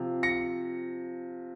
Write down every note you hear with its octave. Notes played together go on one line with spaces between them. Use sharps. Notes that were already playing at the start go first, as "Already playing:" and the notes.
Already playing: C3 F3
A#6 C#7